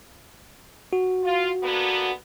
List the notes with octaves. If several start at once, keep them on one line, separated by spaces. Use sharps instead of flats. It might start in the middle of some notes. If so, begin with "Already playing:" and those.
F#4
F4
D3 A#3 B3